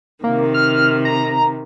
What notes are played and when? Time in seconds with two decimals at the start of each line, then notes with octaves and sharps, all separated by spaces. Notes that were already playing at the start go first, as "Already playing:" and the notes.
0.24 C3 D#3 A#3
0.54 F6
1.05 A#5